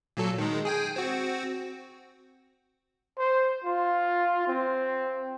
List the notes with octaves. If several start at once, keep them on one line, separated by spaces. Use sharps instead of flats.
A#2 F#3 A4
D#3 G#3
G#4 G5 G#5
C4 F#4
C5
F4
C4